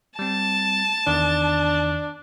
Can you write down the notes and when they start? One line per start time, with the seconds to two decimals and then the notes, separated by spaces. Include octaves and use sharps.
0.19 G3 C4 A5
1.07 E2 D#3 D4